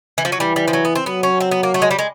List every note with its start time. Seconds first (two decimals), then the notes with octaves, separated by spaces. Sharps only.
0.18 E3
0.25 F3
0.32 F#3
0.39 E3 G3
0.56 G3
0.68 F3
0.73 F#3
0.85 B3
0.95 C4
1.06 F#3 B3
1.23 C#4
1.40 C4
1.51 B3
1.63 A#3
1.74 A3
1.82 G#3
1.91 G3
1.99 G#3